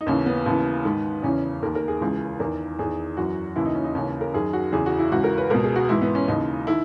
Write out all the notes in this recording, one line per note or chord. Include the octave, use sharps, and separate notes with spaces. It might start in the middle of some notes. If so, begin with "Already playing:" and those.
D#4
D#2 C#3 E3 C#4
B3
D#2 C#3 E3
G#2 D#3
E2 C#3 E3 C#4
D#2 D#3 A#4
A#4
G#4
C#2 C#3 E3
E2 D#3 A#4
E2 D#3 G#4
F#2 E3 F#4
D#2 C#3 E3 E4
D#4
C#4
D#4
D#2 C#3 E3 C#4
C#4
A#4
F#2 D#3 G#4
F#4
E2 C#3 E3 G#4
F#4
E4
C#2 C#3 E3 F#4
A#4
B4
C#2 B2 A#4
G#4
F#4
G#2 E3 E4
B3
C#4
D#2 C#3 E3 D#4
D#3 E4